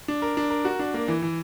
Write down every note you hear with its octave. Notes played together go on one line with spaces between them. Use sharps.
D4
A#4
D4
A#4
F#4
D4
A#3
E3
E3